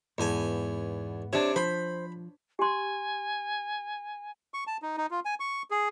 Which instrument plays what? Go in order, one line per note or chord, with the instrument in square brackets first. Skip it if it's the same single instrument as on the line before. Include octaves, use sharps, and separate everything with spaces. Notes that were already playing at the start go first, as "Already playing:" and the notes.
[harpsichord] E2 G#5 [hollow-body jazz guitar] G#2 B3 A5
[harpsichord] C3 [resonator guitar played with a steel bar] D4 C#5
[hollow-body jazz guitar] F3 [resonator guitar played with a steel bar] C5 [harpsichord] B5
[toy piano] G4 C6 [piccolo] G#5
[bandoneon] C#6
A5
D#4
D#4
F4
G#5
C#6
G#4